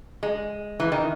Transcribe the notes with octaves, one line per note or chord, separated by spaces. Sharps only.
G#3
E3
D#3